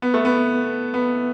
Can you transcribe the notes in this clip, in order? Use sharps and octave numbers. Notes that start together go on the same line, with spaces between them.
B3
A3
B3
B3